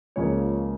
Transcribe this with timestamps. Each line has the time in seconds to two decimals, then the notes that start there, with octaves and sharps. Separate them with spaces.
0.16 C#2 C#3 F3 A#3 C#5